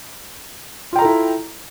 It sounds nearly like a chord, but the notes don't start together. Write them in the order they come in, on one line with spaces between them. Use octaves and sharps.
F4 G5 A#5 A4 E4